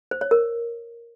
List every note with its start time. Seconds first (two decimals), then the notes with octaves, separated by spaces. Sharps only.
0.11 C5
0.21 C#5
0.31 A#4